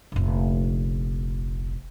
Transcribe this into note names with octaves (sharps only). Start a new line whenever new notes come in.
F1 A#1